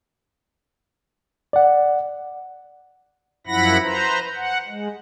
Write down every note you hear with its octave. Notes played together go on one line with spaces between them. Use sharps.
D5 F#5
F#2 F3 E4 F#5 B5 A#6
B4 C5 A#5
F#5
G#3